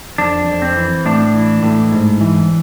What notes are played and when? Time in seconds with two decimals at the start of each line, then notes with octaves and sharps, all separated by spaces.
0.18 F2 D4
0.47 F2
0.62 C4
0.76 E3
1.05 A2 D4
1.34 E3
1.63 A2
1.92 G#2
2.21 E3